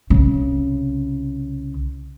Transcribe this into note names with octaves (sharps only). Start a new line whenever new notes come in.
C2 C#3